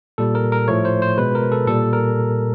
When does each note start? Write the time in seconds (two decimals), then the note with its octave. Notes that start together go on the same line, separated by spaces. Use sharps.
0.18 A#2 G3 A4
0.35 A#4
0.52 A#4
0.68 A2 F3 A3 C#5
0.85 C5
1.02 C5
1.17 B2 G#3 B4
1.35 A#4
1.52 A4
1.67 A#2 G3 A4
1.93 A#4